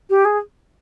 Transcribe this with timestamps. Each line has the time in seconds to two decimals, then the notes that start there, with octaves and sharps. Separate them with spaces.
0.09 G4
0.24 G#4